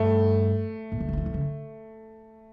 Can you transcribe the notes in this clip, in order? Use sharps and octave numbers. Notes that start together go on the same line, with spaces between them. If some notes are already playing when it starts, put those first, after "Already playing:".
Already playing: G2 A3
A#2
C#3
D3
F3
E3
D3
C#3